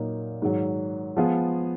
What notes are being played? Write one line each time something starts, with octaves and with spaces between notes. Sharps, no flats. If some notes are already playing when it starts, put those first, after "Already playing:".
Already playing: A#2 F#3 A#3 D#4
G#2 D#3 F#3
F3 G#3 B3 F4 G#4